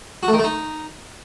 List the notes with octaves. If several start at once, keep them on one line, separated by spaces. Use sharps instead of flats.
F#4
A3
D#3
A3
D#4